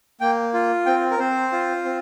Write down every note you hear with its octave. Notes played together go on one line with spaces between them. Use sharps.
A#3 G5
F4
C4 G5
A#4
C4 C5
F4
C4